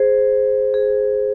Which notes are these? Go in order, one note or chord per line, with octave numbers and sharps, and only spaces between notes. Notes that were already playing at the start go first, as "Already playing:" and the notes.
Already playing: G#4 C5
G#4